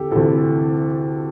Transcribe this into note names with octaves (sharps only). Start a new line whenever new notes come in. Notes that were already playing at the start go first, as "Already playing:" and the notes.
Already playing: D2 C3 E3 G4 A4
D2 C3 E3 A4